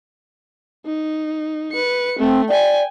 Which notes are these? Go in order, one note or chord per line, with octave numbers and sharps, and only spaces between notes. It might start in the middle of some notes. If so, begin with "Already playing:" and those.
D#4
B4 C#7
A3 C4
D5 G5 G#5